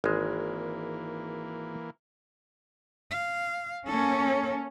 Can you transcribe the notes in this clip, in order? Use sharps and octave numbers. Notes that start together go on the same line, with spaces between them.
G#1 E3 G#3 A#3
F5
A#3 C#4 A4